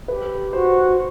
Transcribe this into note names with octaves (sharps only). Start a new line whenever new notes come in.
G4 A4 B4
F#4 C5